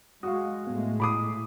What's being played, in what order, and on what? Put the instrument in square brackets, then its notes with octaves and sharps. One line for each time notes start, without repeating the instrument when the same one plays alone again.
[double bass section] G#3 [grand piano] F#4 [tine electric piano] F5 C#6 D#6
[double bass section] A2 G#3 A3 [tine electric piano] B3
[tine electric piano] A#2 E4 C7 [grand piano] B5 D6 D#6